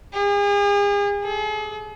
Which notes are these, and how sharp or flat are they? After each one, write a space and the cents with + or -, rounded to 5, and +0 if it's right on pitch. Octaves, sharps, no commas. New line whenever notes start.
G#4 -40
G#4 +45